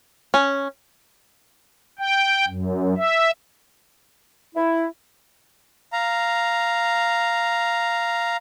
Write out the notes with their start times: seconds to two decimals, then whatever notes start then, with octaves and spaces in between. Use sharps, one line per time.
0.34 C#4
1.99 G5
2.47 F#2
2.98 E5
4.55 E4
5.93 F5 A#5